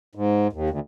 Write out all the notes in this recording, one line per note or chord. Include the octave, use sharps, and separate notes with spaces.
G#2
D#2
D2